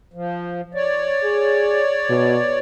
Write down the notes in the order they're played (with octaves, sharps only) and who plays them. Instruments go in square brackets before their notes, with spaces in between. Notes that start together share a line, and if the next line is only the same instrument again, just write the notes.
[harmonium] F3
C#5 D5
[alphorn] G#4
B2